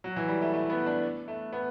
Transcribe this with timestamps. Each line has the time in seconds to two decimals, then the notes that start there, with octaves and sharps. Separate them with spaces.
0.04 F#3
0.16 E3
0.28 G3
0.42 A3
0.54 A3
0.70 B3
0.86 D4
1.28 A3
1.53 B3